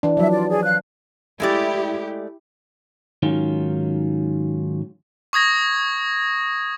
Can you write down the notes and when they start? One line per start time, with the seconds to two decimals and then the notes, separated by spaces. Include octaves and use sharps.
0.03 E3 D4
0.17 F3 F#3 E5
0.31 F4 D5
0.49 G#4 D5
0.65 F5 F#6
1.40 G#3 A3 E4 G4 D5
3.23 G#2 D#3 F#3 C#4 F4
5.33 C#6 D#6 G#6 A#6